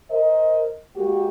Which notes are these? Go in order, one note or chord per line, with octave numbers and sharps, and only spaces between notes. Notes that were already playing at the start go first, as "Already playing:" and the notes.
A#4 C5 D#5
G#3 A#3 F#4 G4